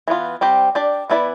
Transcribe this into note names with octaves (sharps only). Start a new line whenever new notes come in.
E3 B3 F4
G3 C4 G4 C5
D4 G4 D5
E3 B3 E4 B4 D5